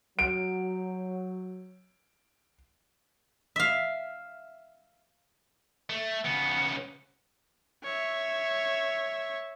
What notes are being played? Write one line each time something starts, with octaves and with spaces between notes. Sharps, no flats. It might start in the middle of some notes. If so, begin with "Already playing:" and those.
F#3 D7
E5 F5
A3
C#3 B3 C#7
C#5 E5